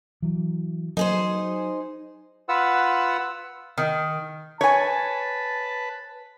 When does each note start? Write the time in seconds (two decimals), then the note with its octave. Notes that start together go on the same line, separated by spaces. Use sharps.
0.22 E3 F#3
0.97 F#3 D#4 G#4 C5
2.49 F4 B4 F#5 E6
3.78 D#3
4.61 B4 C#5 G#5 A5